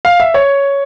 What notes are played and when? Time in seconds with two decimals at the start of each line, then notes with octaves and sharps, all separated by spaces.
0.05 F5
0.20 E5
0.34 C#5